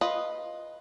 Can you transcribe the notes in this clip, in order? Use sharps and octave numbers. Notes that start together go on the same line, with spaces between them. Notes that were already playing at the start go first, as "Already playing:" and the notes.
F4 B4 D#5